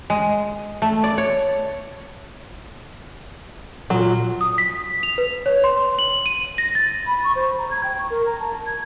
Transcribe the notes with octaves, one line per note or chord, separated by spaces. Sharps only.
G#3
A3
D5
C#5
A#2 F#3
D#6
B6
F7
B4
C#5
C6
F#7
D#7
A#6
A6
B5
C#6
C5
A#5
G#6
G5
C#6
A#4
A#5
A5
G#6